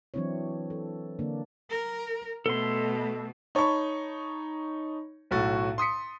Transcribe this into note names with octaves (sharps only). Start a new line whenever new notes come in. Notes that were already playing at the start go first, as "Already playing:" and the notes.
E3 F#3 C4 D4 E4 C#5
A4
D3 A#3 D4
A#4
B2 A3 A4 C6
D#4 C#5 A5 B5 C#6
B1 A2 F#4 A6
C6 D#6 B6 C#7